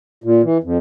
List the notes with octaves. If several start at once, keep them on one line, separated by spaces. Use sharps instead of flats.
A#2
E3
F2